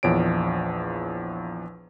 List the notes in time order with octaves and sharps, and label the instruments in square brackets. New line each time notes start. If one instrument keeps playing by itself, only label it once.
[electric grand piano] A#1 E2 F3 C#5 D7